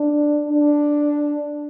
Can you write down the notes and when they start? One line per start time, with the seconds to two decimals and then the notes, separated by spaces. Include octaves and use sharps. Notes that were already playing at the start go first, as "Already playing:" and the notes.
Already playing: D4
0.49 D4